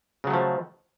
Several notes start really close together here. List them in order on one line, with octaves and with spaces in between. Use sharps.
C#3 F#3 A3 F3